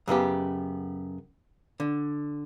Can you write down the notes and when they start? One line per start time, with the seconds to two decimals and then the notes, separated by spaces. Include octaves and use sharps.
0.08 F#2 C#3 B3 G4
1.80 D3